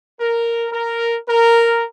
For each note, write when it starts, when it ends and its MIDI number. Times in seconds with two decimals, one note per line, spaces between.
0.20 0.68 70
0.71 1.17 70
1.29 1.84 70